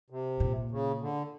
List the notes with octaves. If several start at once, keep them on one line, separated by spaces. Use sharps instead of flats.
C3
A#2
C#3
D3